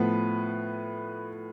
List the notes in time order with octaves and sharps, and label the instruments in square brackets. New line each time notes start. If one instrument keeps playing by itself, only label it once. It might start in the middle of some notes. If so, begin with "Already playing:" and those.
Already playing: [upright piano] A2 F3 B3 B4